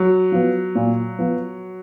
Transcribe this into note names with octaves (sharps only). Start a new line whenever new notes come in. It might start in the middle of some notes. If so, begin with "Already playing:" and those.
Already playing: F#3
F3 B3
A#2
F3 B3